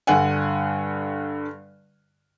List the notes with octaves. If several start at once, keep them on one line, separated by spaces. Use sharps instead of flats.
G2 D3 F#5 G#5